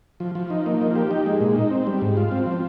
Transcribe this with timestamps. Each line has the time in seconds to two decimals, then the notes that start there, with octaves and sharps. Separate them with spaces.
0.20 F3
0.35 F3
0.50 D#4
0.66 A#3
0.81 F3
0.96 G4
1.11 D#4
1.26 G#3
1.41 A#2
1.56 D#4
1.71 C4
1.87 G3
2.02 G#2
2.17 F4
2.31 C4
2.46 F3